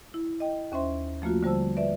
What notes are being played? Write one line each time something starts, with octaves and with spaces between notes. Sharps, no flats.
E4
D#5 G5
D#2 C#4 C5 E5 C6
F3 A3 A#3 F4 F#4
D3 G3 C5 A5 E6
B4 D5 E5